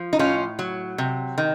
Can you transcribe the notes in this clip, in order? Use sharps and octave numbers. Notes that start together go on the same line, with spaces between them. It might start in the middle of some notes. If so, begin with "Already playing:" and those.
Already playing: F3
D#4
A2 C#4 F4
F#3
C3
D#3